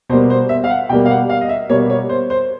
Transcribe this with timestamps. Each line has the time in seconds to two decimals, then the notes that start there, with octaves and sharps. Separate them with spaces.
0.09 B2 G3 A#3 C5
0.30 C5
0.49 E5
0.64 F5
0.70 F#5
0.89 B2 G3 A#3 G5
1.05 F5
1.10 F#5
1.29 F5
1.41 D#5
1.49 E5
1.69 B2 G3 A#3 C#5
1.90 C#5
2.09 C5
2.30 C5